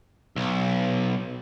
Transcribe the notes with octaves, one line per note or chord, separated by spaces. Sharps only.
B1